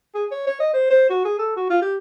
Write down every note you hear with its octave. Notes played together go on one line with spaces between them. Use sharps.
G#4
C#5
C#5
D#5
C5
C5
F#4
G#4
A4
F#4
F4
G4